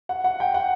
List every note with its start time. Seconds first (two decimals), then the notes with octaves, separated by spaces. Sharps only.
0.09 F#5
0.24 F#5
0.40 G5
0.54 F#5